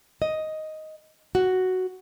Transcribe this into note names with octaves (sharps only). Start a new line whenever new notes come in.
D#5
F#4